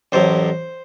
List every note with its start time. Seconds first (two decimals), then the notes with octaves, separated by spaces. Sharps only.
0.12 A1 A2 F#3 C5